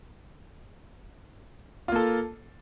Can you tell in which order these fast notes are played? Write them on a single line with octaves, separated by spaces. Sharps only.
F4 A#3 A4